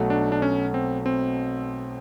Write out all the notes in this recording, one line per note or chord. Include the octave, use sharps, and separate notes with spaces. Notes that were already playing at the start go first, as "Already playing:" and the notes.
Already playing: B1 B2 F#3 A3
D4
D4
C#4
C4
C4